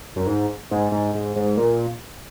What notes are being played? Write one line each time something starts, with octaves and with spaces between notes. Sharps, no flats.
F#2
G#2
G#2
G#2
G#2
G#2
A#2